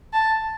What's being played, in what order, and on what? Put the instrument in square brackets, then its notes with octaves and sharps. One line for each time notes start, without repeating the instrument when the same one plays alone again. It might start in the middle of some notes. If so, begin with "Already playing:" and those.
[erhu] A5